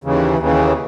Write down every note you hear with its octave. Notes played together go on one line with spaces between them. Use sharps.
D#2 C#3 E3
D#2 C#3 E3